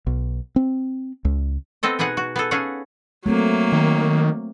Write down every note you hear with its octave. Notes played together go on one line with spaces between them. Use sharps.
B1
C4
C#2
B3 C4 A4 D#5
B2 B3 D#4 G#4 F#5
F#4
B3 G#4 A4
C#4 G#4 A4 F5 F#5
F#3 A3 A#3 C4
D#3